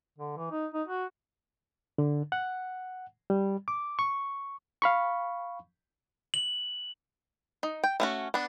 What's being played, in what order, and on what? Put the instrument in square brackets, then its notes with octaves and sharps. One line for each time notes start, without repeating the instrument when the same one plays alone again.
[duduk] D3
E3
D#4
D#4
F#4
[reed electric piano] D3
F#5
G3
D6
C#6
F5 B5 C#6
[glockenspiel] F#7
[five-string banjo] D#4
G5
A3 C#4 F#4
B3 D4